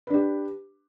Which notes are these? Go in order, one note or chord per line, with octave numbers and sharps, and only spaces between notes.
D4 G4 B4